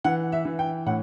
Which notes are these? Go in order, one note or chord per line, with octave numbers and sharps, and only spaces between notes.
E3 F#5
E5
E3
G5
A2 F#5